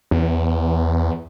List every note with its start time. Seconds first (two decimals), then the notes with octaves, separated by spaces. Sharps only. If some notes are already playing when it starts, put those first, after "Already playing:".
0.11 E2